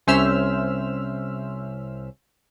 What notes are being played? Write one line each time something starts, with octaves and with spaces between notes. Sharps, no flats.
C2 C#4 C5 E5 E6 F6